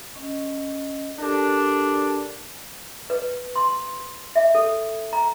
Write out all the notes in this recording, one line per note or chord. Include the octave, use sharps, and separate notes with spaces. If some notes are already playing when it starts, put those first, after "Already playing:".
C#4 D#5
D4 G4 A4 A#4
B4
C6
E5
A4
A#5